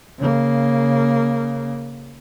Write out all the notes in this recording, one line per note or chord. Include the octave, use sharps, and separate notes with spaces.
C#3 A#3